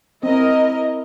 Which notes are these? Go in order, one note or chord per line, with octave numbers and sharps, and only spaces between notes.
C4 E4 A#4 D#5